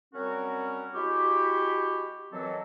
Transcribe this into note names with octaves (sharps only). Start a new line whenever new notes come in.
F#3 G3 C4 C#4 F#4 A#4
G#3 E4 F#4 G4
F#2 E3 F#3 C4 A4 D#5